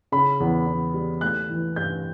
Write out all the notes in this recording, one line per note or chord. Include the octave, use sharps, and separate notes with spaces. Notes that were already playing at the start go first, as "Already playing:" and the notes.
C#3 B5
E2
E2
G3
A3 F#6
E3
G2 G6